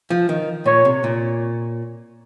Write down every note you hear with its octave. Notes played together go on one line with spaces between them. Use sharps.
F3
D#3
A#2 C#5
C3
A#2